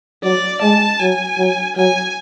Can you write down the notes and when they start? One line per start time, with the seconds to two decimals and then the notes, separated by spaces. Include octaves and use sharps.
0.24 F#3 D5
0.62 G#3 A5
1.00 F#3 G#5
1.38 F#3
1.76 F#3 G#5